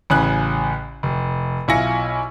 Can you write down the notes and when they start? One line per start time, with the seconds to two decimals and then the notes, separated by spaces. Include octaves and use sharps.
0.10 A1 C#3 G#5 F#6
1.03 F1
1.68 B1 E4 F4 G#5 A#6 C#7